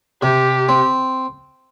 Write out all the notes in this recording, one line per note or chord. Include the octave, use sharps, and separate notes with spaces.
C3 G4
C4